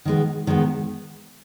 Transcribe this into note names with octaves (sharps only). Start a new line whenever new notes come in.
D#3 G#3 B3
D#3 G#3 B3